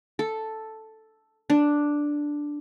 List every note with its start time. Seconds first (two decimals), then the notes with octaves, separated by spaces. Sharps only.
0.19 A4
1.50 D4